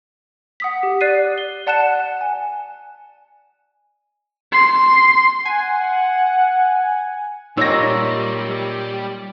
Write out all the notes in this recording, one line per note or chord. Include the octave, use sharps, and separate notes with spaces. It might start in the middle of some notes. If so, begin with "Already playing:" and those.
F#5 D#6 B6
G4
D5 F#6 C7 D#7
G7
D5 F#5 A5 F#6 C#7 E7
G#5
C6
F#5 G#5
A#2 G3 D#4 G4 C#5 E6 A#6